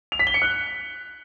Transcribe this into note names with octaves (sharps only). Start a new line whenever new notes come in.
F7
B6
G7
C#7
F#6